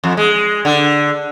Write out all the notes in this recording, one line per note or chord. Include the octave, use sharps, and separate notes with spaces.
F2
G#3
D3